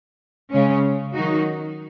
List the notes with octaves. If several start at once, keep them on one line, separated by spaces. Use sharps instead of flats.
C#3 G#3 C#4
D#3 F#3 D#4 F#4